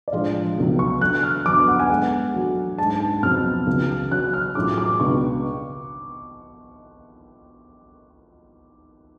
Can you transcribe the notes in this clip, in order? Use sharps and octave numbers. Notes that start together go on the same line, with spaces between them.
D5
A2 F3 G#3 D4 F4 F5
C#2 B2 F#3 A3
C#6
F#3 A3 D4 F#6
F6
D2 D3 F#3 B3 D6
F#5
G#5
D3 G#3 B3 F#5
F#3 A3 D4 F#4
G#2 G#3 D4 A5
A5
F2 C#3 F#3 B3 F6
C#2 C#3 F#3
F#3 C#4 F#4 C#5 F#6
F6
A2 F#3 C#4 F4 G#4 D6
D6
C#2 B2 G#3 D4 F#4 C#6